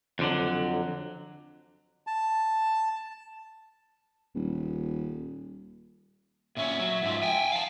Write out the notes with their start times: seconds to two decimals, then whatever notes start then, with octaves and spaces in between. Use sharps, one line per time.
0.19 F2 D3 F#3
2.07 A5
4.35 D#1
6.57 A#2 C#4 E5
6.80 F#3
7.03 G#2 F3
7.23 G5 G#5
7.52 F5 A5